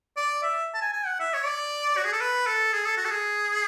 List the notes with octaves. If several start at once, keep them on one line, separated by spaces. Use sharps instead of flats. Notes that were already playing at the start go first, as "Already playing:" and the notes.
D5
E5
A5
G#5
G#5
F#5
E5
C#5
D5
F#4
G#4
A4
B4
A4
G#4
A4
F#4
A4
G#4